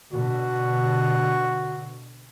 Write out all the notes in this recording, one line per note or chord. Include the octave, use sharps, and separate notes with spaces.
B2 D3 F#4